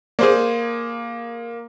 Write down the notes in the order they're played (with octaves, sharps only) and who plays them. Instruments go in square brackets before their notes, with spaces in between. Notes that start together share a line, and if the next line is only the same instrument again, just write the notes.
[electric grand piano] A#3 [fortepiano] G#4 C5 D5